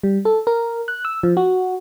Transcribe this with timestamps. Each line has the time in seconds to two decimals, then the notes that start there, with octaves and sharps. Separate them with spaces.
0.03 G3
0.25 A4
0.47 A#4
0.88 F#6
1.05 E6
1.23 F3
1.37 F#4